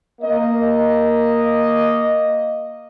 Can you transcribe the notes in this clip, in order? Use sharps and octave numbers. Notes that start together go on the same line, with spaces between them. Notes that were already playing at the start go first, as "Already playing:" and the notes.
A#3 D#5